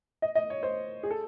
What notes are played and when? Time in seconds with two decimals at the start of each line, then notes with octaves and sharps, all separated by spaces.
0.22 D#5
0.35 D#5
0.50 C#5
0.63 C5
1.03 G#4
1.11 A4